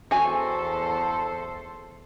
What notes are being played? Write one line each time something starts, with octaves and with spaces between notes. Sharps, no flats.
E2 F#4 A4 C5 G#5